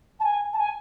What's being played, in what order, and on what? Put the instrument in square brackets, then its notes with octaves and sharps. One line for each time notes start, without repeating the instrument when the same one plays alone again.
[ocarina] A5
G#5
A5
G#5